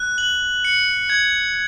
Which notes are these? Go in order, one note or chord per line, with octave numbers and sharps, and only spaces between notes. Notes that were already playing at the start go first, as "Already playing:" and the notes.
Already playing: F#6
F#7
C#7
G#6